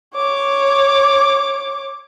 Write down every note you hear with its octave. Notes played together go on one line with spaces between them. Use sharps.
C#5 D6